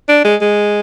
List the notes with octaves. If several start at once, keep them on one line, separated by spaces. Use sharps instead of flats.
D4
G#3
G#3